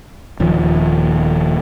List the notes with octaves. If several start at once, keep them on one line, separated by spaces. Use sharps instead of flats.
D#1 D#2 F3